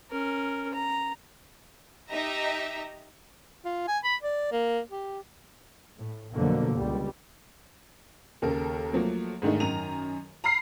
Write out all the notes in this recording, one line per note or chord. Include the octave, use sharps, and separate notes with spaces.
C#4 A#4
A#5
D#4 G4 D#5 E5 A#5
F4
G#5
B5
D5
A#3
G4
A2
F2 B2 D3 F#3 A#3
C#2 G3
D#2 C#3 A4 A#4
F3 F#3 A3 A#3
G#2 D3 D#3 A3 D#4
F#2 D#3 A#5 D#7 F7
A#5 B5 F6 C7